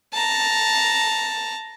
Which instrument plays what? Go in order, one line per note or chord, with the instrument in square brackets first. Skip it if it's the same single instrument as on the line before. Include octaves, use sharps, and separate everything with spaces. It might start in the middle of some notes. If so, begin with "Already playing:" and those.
[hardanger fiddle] A5 A#5